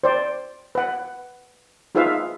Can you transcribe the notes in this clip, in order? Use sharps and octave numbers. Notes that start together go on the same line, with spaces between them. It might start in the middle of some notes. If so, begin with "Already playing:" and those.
C5 D5
B4 F#5
D#4 F4 G#4 B4 E5 F5